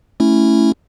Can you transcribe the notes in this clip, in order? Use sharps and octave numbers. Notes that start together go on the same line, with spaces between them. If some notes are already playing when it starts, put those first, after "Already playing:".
A3 C#4 E4